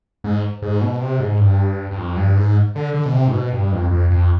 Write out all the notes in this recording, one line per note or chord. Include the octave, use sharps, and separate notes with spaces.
G#2
G#2
B2
C3
G#2
G2
G2
F2
G2
G#2
D3
D3
B2
C3
G#2
B2
G2
F2
F2
F2